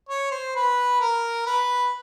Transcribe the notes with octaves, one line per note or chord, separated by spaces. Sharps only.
C#5
C5
B4
A#4
B4